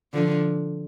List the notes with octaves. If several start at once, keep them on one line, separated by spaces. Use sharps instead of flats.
D3 F3